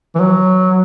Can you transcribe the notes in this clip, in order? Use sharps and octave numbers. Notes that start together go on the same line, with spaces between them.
E3
F#3